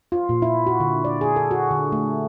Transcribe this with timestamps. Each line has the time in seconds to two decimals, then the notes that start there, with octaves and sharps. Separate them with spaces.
0.12 F4
0.29 A#2
0.42 E4
0.67 F#4
0.80 D3
1.05 D5
1.21 G#4
1.36 A4
1.51 F#4
1.71 D3
1.92 A3